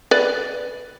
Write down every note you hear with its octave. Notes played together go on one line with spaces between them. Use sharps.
B4 D5